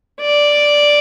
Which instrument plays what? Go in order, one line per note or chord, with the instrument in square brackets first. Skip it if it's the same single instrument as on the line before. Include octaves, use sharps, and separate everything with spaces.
[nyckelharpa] D5